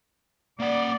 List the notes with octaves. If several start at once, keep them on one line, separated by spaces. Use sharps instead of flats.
A#3 D5 F#5